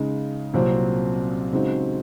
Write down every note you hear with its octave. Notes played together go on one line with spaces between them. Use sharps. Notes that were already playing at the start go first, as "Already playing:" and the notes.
Already playing: C#3 G#3 D#4
C2 A#2 F#3 C4
C#3 G#3 C4 D#4 F#4